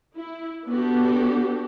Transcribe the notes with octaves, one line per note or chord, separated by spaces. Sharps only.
E4
B3 D4 F#4 G4 A4